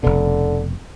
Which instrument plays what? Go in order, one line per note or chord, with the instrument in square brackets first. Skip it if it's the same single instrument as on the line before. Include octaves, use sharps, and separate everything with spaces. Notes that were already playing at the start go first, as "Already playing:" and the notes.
[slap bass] F1 B2 [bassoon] D3